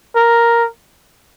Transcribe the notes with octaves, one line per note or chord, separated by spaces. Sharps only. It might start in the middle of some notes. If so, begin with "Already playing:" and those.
A#4